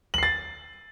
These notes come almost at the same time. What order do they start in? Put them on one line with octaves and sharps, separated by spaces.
F#7 C7 A6